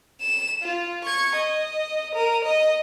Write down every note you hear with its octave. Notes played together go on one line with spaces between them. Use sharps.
E7
F4
C#6 G#6
D#5
A#4 D#7
D#5